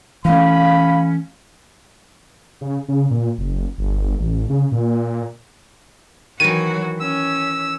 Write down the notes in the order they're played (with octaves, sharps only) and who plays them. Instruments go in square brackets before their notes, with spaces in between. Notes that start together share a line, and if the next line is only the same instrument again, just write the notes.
[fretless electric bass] E3 A3 [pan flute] C#4 [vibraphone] F5 [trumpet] B5
[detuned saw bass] C#3
C#3
A#2
F#1
G1
A1
C#3
A#2
[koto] D#3 E3 [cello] F#3 F#4 [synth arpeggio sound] D#7
[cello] C#4 [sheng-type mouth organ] E6